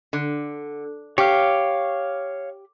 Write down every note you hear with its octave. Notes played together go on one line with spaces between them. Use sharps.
D3
G4 C#5 F5